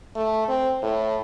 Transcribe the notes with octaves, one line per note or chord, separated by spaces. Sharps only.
A3
C4
A2